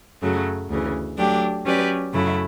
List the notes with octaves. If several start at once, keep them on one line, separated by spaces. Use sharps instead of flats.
F#2 C#3 F#3 A3
D2 C#3 E3
F#3 A3 D4 G4
F#3 C#4 G4 B4 D5
F#2 C#3 F#3 A3 E4